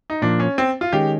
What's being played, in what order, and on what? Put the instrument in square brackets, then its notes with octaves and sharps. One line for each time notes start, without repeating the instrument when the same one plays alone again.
[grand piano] D#4
[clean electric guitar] A#2 F3 A#3 [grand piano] D4
[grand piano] C#4
C4
F4
[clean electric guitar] D#3 G#3 C#4 [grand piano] G4